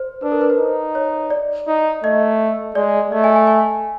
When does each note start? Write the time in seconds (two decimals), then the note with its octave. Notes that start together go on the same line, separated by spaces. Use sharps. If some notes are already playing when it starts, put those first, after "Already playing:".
Already playing: C5
0.22 D4 B4
0.32 A#4
0.41 B4
0.50 C5
0.59 D#4
0.95 C#5
1.30 D5
1.67 D#4
2.03 A3 D#5
2.75 G#3 D5
3.11 A3 D#5
3.24 G#5
3.36 G#5
3.47 G#5